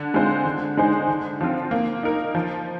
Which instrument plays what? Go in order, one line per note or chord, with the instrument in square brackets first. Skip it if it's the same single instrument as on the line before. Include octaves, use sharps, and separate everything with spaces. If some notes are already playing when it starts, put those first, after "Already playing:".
Already playing: [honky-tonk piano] D3
G#3 C4 F4 C5
D3
G#3 D#4 G#4 C5
D3
F3 C4 F4
A#3
D#4 A#4
F3